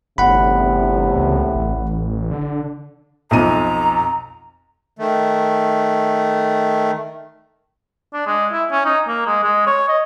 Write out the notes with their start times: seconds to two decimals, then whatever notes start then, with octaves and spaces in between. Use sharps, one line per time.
0.18 G1 E2 A2 C3 F#5 B5
1.16 C#2
1.55 A1
2.31 D3
3.31 B1 F2 A#5 D#7
4.99 D#3 A3
8.14 D4
8.27 G#3
8.52 E4
8.72 C#4
8.85 D#4
9.08 A#3
9.26 G#3
9.44 G#3
9.67 C#5
9.89 D#5